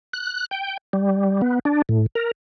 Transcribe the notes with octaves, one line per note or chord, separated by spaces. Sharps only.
F#6
G5
G3
B3
D4
A2
A#4